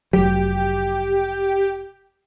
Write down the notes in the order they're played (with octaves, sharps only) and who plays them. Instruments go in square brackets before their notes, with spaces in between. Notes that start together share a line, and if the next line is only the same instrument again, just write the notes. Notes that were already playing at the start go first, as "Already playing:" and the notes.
[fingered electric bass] F1 F#3 [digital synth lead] G4